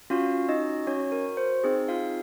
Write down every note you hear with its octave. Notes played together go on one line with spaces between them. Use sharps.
C#4 F4 F#4 F5
D#4 D#5
C#4 F#4 C#5
A#4
C5
C4 D#4 G#4
F4 F5